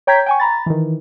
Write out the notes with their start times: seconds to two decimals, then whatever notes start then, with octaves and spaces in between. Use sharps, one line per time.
0.07 C#5 G5 A#5 G6 G#6 B6
0.26 G5 G#5 C#6
0.40 A#5 B5 A6
0.66 D#3 E3